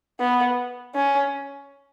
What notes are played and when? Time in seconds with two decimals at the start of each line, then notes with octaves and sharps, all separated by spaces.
0.20 B3
0.95 C#4